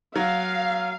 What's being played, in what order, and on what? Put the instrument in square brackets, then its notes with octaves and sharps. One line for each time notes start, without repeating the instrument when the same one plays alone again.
[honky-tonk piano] F#3 [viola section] F5